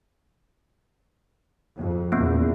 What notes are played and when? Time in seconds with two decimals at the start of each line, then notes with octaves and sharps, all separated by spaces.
1.76 F2
2.12 E2 A#2 A#3 B3 C#4